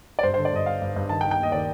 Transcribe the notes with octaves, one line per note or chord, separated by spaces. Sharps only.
D5
G2 C5
C5
D3
D5
G2 D#5
G2 F5
G2
G2
D#3 A5
G5
D#3
G5
D#2 D#5
D#3 D5